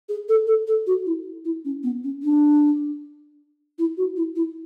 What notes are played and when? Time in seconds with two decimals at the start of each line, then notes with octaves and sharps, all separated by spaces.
0.08 G#4
0.28 A4
0.47 A4
0.67 A4
0.86 F#4
1.06 E4
1.44 E4
1.64 C#4
1.83 B3
2.03 C#4
2.22 D4
3.78 E4
3.97 F#4
4.16 E4
4.35 E4